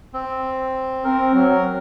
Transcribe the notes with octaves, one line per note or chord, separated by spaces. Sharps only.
C4
C4 A#4
F#3